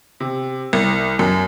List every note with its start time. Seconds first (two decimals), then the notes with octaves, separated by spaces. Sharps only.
0.20 C3
0.73 C2
1.19 F#2